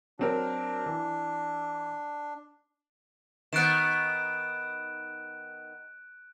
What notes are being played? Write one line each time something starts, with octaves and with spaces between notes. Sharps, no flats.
F#3 C4 D4 A#4
E3
D#3 B3 F#6 D7 E7